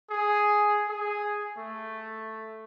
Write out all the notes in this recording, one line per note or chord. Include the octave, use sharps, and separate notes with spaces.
G#4
G#4
A3